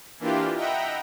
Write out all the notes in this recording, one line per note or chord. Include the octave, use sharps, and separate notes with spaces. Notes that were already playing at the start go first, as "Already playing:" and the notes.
E3 A#3 D4 E4 F4 G4
D#5 E5 F#5 G5 A#5 B5